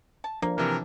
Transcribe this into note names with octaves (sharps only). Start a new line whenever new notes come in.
A5
F3 A#3 D4
C3 E3 A#4